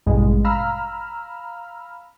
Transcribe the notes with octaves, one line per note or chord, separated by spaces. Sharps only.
A1 G2 B2 G#3
F5 A#5 B5 E6 F6